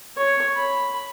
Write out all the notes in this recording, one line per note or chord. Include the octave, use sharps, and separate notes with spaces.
C#5
B5